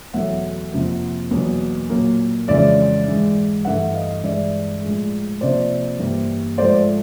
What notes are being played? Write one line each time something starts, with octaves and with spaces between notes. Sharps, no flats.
E2 B2 F#3 A3 E5 F#5
F2 C3 F3 A#3
E2 B2 F#3 A#3
A#2 F#3 A#3
F2 C#3 E3 G#3 D5 E5
G#2 E3 G#3
G2 E3 A3 E5 F#5
D#5 F5
G2 E3 G#3 D5 E5
A2 F3 G#3
C3 F3 A#3 C5 D5
G2 E3 G3 A#3
G#2 F3 A3 C5 D5